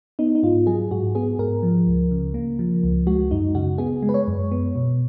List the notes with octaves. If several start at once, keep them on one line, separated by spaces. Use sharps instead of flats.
B3 D#4
D#4
G#2 F4
F#3 G#4
G#2 F#4
B3 G#4
G#2 A#4
F3
C#2
C#3
A#3
F3
C#2
G#3 F#4
F#2 D#4
C#3 F#4
B3 G#4
G#3
B4
C#5
F#2
B3
B2